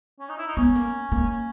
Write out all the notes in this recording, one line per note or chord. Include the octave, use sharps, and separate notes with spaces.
C#4
D#4
E4
D#4
B3 C#4
A#3
A#3
C#4